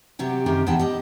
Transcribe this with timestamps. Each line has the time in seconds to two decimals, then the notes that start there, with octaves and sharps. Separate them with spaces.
0.19 C3 F#3 G3 G4
0.46 F#2 C3 D#3 D#4 G4 A#4
0.67 E2 B3 D#4 F#5 G5 A5
0.79 G3 D#5